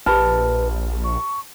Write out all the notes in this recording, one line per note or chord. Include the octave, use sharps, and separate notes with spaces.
A#1 G4 B4 A5 B5 F6
C#6